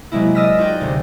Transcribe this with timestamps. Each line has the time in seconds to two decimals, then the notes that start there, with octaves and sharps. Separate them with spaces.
0.12 C3 F#3 G#3 A#3 E4
0.35 D5 D#5 E6 F6 A#6 B6
0.58 D#4 F4 F#4 G#4 D5 G5
0.81 D2 C3